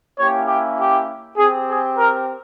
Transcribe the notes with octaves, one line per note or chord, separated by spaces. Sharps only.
A#3 C#4 E4 G4 C#5
G4
G4
C4 G4 G#4
G#4
A#4